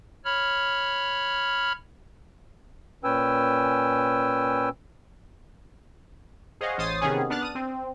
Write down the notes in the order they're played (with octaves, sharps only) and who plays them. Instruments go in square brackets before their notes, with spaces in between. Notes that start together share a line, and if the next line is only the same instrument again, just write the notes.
[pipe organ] C#5 B5 F6
[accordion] A#2 C#4 B4 G5 G#5 E6
[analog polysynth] G#4 C5 C#5 D#5 F5 F#5
A1 C5 C#5 D#6 A6 C7
C3 D#3 B3 C#4 G#4
B3 D4 F6 F#6 A6
D#6 D#7
C4